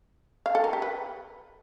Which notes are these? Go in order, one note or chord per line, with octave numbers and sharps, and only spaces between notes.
F5
A4
A#4
G4
B4